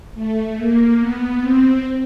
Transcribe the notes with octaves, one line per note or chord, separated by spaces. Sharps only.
A3
A#3
B3
C4